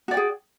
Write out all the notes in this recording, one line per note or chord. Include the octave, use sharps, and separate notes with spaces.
F#4 G#4 D5 G5